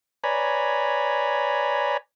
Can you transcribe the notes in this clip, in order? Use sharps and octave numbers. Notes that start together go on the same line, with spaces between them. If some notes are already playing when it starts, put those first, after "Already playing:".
B4 C#5 D5 G#5 A#5 B5